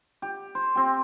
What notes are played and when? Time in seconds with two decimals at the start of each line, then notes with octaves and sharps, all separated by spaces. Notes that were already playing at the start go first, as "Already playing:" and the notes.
0.22 G4
0.55 C5
0.75 C4 G4